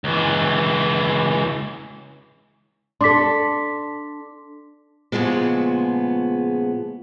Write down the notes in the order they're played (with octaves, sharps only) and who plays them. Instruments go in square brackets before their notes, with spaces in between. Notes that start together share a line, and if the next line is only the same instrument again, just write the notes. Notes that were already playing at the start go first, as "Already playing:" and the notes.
[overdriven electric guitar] C#2 E3
[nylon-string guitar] D4 A4 [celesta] C6 D6 B6
[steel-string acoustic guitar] A#2 C#3 F3 G#3 B3